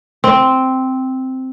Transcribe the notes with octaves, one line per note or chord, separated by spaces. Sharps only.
C4